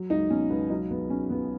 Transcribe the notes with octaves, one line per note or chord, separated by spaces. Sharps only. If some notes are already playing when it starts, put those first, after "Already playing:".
Already playing: F#3
C#2 D#4
B2 C#4
C#2 B3
F#3 D#4
B1 B3
B2 C#4
B1 B3